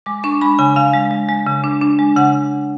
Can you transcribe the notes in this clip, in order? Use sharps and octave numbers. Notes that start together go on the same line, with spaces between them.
G#3 D6
D4 C#6
G#3 B5
C#3 G#5
C#3 F5
G#3
G#3
G#3
C#3
D4
D4
G#3
C#3 F#5